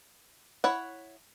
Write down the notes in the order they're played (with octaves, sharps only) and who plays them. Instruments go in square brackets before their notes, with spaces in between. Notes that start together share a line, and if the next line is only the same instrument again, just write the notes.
[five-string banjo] E4 C#5 F#5